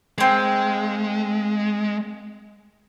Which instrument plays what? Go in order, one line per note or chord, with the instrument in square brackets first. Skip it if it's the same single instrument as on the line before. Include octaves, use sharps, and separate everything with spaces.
[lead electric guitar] G#3 [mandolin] A#3 C4